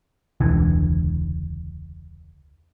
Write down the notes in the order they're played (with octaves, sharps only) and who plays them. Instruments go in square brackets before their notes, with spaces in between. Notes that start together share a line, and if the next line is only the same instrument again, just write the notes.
[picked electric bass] E1 C#2 D3 E3